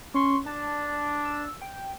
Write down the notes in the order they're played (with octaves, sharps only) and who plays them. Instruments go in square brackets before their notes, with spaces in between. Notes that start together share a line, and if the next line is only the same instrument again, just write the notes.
[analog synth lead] C#4 [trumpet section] C6 C#6
[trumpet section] D4 [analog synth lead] A5
[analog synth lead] E6
G5